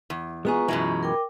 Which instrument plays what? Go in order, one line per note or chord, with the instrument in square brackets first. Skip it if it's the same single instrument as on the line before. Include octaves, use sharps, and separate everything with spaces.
[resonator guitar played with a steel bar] E2
[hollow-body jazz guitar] G#3 B3 G#4 [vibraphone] F4 A#5 C#6
[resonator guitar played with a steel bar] F#2 B2 G#3 [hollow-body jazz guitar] E3
[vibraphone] A#4 G5 D6